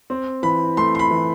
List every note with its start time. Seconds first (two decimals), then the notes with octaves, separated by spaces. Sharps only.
0.10 C4
0.43 E3 B5
0.77 A3 C6
0.95 C6
0.99 B5
1.11 E3